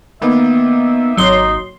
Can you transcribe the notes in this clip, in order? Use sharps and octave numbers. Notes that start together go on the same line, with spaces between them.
D#3 A#3 B3 E5
G#1 F#3 D#4 C6